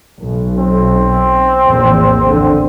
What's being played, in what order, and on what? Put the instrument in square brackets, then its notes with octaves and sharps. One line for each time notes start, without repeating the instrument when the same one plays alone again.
[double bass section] B1
[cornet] C4
[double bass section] A#1 E2 A2
D3